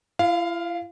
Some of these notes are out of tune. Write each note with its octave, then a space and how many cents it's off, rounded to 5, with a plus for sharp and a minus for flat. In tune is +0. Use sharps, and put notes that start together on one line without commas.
E4 +45 F5 +0